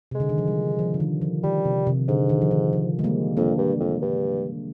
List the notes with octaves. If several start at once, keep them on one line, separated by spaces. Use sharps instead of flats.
C3 G#3
D3
D#3
F3
G3
F3
D3
D#3
F3
D#3 G3
C3
C3
G#2 D3
D#3
F3
D#3
F3
G#3
G3 A#3
F2 A#3 D4
G2
F2
G2